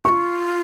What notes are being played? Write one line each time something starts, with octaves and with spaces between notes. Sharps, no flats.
F4 G4 C#6